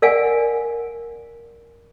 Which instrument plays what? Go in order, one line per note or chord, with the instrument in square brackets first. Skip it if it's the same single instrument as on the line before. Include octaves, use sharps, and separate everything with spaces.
[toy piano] A#4 D5 F5 F#5 G#5